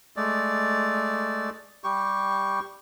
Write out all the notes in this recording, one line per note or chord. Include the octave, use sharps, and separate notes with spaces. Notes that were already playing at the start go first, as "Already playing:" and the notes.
G#3 A3 D5
G3 G4 C#6